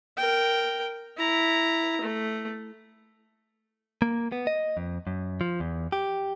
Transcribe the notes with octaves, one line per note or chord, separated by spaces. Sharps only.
A#4 G5
E4 A#5
A3
A#3
B3
D#5
F2
F#2
F3
E2
G4